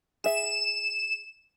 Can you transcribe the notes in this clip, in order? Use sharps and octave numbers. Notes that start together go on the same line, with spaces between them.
G#4 E5 E7